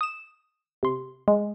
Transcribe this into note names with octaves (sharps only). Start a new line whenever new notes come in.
D#6 E7
C3 C6
G#3